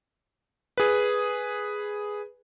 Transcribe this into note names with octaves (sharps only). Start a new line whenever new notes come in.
G#4 B4